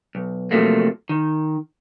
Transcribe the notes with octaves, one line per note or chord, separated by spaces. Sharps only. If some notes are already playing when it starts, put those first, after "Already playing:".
B1
C3 D#3 F3 F#3 A3 A#3
D#3